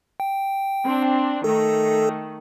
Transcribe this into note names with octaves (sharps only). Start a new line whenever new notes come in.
G5
C4 D4
D#3 A3 A4